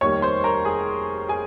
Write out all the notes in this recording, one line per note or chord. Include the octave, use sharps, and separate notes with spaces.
F1 D#2 D#3 G3 A#3 C#5 C#6
C5 C6
A#4 A#5
G#4 G#5
G#4 G#5